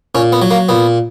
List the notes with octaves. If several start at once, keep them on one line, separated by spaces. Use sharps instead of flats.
A#2 C#4
B3
F#3
A#3
A#2 B3